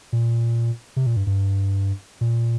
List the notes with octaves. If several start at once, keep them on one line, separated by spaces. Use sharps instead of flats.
A#2
C3
A#2
G2
G2
A#2